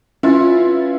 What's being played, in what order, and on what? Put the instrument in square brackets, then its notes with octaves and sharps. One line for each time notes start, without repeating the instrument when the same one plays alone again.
[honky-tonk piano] C#4 E4 [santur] F4 B4